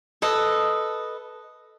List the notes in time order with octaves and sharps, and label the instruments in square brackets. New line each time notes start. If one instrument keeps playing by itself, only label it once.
[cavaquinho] A4 B4 D#5